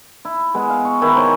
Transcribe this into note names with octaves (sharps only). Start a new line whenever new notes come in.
E4
G#3 B3
F5
C#6
D#3 E4 B4
A#4 C5 C#5 G#5